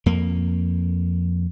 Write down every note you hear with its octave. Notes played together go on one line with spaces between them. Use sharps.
F2 A#3